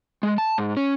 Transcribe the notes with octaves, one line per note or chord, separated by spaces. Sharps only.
G#3
A5
G#2
C#4